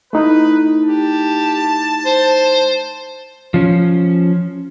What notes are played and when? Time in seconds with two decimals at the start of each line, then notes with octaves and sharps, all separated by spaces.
0.13 A3 D#4 E4 B4
0.84 G4 A5
2.06 C5
3.54 F3 C#4